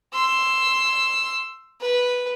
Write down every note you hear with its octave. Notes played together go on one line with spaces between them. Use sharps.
C6 E6
B4